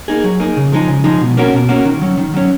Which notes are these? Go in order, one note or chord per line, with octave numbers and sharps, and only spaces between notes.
A#3 D#4 G#4
F#3
A#3 D#4 G#4
C#3
F3 G#3 D#4 G#4
C#3
F3 G#3 D#4 G#4
B2
A#3 C#4 F#4 A#4
B2
A#3 C#4 F#4 A#4
D#3
F#3 C#4
D#3
F#3 C#4